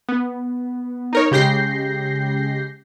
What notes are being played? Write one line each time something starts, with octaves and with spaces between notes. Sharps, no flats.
B3
D#4 A#4 C#5
C#3 G#3 G4 G6 A#6 C7